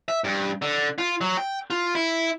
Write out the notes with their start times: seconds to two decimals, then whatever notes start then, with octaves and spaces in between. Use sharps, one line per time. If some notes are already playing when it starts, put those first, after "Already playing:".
0.08 E5
0.24 G2
0.62 D3
0.98 F4
1.21 F#3
1.37 G5
1.70 F4
1.95 E4